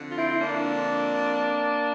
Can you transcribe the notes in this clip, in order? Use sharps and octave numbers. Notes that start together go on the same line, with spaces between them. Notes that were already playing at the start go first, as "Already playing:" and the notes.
Already playing: F2 D3
F4
C4 E4
E4
F2 A#3 D4